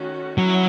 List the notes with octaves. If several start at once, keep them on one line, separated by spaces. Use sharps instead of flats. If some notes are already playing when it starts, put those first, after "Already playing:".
Already playing: D#3 A3 C#4 F#4
F#3 C#4 E4